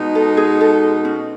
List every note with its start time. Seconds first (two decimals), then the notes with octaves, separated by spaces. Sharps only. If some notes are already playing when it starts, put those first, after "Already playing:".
Already playing: B2 G#3 D#4
0.15 A4
0.37 G#4
0.60 A4
1.05 C#4